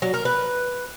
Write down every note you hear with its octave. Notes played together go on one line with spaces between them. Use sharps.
F#3
A#4
B4